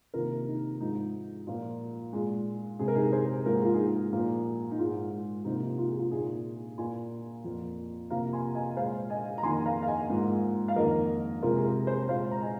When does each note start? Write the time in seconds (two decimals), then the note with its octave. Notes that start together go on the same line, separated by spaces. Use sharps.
0.14 C3 D#3 A#3 F4 A#4
0.47 D#4
0.80 G#2 F3 G#3 D#4
1.47 A#2 F3 A#3
2.13 A#2 G#3
2.79 C3 G#3 G#4
2.88 A#4
2.95 D#4 G#4
3.12 G#4 C5
3.46 G#2 F3 A#3 A#4
3.55 G#4
3.65 F4
3.74 D#4 G#4
4.12 A#2 F3 A#3
4.71 D#4
4.79 G#2 G#3 F4
5.45 C3 F3 A#3 D#4
5.62 D#4
5.78 F4
5.88 G#4
5.98 F4
6.11 A#2 A#3 D#4 G#4
6.78 A#2 A#3 G#5 C6
7.44 F2 F3 A#3
8.10 C3 F3 A#3 F5 A#5
8.33 G#5 C6
8.55 D#5 G#5
8.77 A#2 G#3 C5 F5
9.10 D#5 G#5
9.38 A#5
9.43 F2 D#3 A#3 G#5 C6
9.61 G#5
9.66 F5 A#5
9.82 F5
9.87 D#5 G#5
10.10 G#2 F3 A#3
10.68 F5
10.76 F2 D#3 A#3 A#4 D#5
11.42 C3 G#3 F4 A#4
11.56 G#4
11.65 F4 A#4
11.87 G#4 C5
12.09 A#2 G#3 C5 F5
12.31 A#5
12.42 D#5 G#5